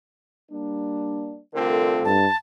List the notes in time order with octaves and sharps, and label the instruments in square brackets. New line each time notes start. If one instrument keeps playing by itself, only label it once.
[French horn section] G3 A#3 D4
[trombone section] C2 D3 C4 [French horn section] A3 F4 A4 [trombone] A#4
[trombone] G2 [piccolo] A5